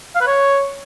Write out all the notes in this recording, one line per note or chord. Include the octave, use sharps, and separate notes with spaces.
F5
B4
C#5